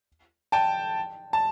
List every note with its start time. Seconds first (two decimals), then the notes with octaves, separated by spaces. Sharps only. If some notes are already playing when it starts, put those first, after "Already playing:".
0.52 G5 A5
1.33 A5